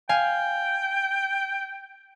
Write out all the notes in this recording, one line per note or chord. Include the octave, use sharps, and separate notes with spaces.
F5 G5 G#5